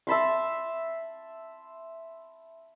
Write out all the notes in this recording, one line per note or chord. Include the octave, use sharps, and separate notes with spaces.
E5 A5 B5 C6